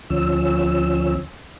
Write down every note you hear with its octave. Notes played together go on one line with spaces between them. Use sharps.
D2 F3 C#4 E6